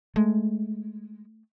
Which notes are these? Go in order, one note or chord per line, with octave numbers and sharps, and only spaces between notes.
G#3 A3